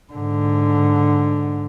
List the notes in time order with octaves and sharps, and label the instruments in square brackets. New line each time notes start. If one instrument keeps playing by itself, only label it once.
[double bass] G#2 D3